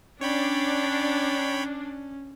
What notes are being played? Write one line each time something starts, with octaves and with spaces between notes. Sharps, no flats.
C#4 D4 C#5 G5 B5